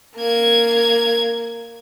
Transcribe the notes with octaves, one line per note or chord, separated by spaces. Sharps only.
A#3 G#6